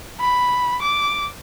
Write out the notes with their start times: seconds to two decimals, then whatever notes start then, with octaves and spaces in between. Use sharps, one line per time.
0.20 B5
0.82 D6